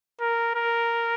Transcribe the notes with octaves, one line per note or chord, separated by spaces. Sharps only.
A#4
A#4